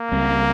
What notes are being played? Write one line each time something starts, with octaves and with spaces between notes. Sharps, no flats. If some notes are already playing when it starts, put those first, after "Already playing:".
Already playing: A#3
C#2 C#3 G3 C4